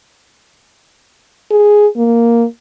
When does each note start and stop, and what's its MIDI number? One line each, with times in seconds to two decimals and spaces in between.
1.51 1.87 68
1.96 2.45 58